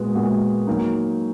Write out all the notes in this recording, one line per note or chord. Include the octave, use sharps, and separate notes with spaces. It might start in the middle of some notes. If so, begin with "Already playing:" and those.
Already playing: A#2 G#3 B3 F#4
A#2 G#3 B3 F#4
F#3 A#3 D#4